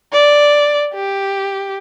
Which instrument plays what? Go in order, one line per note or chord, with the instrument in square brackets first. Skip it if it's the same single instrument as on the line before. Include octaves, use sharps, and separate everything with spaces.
[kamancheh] D5
G4